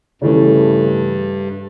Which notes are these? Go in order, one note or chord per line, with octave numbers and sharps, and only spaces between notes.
G2 C#3 E3 A3